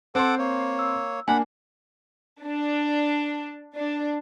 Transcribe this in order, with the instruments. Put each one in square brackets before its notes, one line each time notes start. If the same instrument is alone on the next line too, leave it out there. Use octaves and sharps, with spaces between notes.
[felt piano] C4 C6 [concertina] A4 F#5 D6
[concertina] A#3 C#5
[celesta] E6
[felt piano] A#3 D4 [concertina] F#5 B5 [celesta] G#5
[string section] D4
D4